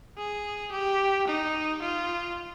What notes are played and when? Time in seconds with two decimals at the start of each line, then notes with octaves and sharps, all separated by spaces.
0.17 G#4
0.71 G4
1.27 D#4
1.82 F4